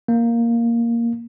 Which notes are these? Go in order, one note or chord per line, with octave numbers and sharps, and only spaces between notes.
A#3